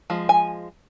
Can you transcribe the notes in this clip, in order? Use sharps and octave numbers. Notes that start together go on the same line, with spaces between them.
F3 G#3
G#5